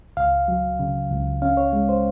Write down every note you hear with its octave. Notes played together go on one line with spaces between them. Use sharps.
C#2 F5
F#3
C#3
C#2
C#4 F5
C#5
G#3
C5